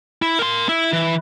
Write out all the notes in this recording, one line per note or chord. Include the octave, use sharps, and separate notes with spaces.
E4
A#4 C6
E4
E3